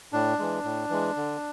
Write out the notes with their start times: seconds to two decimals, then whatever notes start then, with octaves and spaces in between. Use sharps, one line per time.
0.13 A2 D4
0.39 E3 G#3
0.65 A2
0.90 E3 G#3
1.17 D3